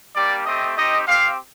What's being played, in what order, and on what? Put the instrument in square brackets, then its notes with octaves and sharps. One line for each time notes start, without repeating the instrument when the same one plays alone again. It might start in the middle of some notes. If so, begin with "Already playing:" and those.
[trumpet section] G3 A#3 D4 G4 D5
A3 C4 G4 D#5
C4 D#4 G4 D#5
C4 G4 F5